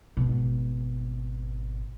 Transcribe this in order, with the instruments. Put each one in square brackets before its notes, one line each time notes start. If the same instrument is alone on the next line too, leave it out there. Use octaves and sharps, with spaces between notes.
[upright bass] G#1 B2